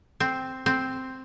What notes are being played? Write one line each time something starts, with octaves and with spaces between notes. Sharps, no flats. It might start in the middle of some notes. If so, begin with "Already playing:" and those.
C4
C4